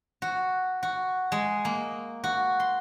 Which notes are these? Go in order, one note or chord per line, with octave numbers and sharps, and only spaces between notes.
F#4
F#4
G#3
A#3
F#4
C6